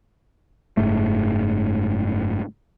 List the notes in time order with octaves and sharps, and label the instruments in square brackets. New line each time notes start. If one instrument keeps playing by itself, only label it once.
[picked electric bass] F#1 G#2 A3